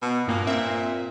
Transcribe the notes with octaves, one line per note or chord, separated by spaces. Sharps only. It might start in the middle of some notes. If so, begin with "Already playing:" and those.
B2
G2 A#2 A#3 G#6
C4 E5